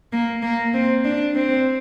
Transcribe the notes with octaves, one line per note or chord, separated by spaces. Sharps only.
A#3
A#3
C4
D4
C4